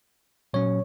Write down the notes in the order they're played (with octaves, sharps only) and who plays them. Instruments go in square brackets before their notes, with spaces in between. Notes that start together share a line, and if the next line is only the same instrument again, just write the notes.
[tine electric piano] A#2 F#3 C#4 C#5